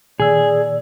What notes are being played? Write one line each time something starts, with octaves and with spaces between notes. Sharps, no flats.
A#2 D#3 G#4 D5 E6